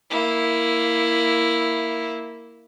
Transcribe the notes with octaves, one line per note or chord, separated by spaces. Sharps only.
A#3 E4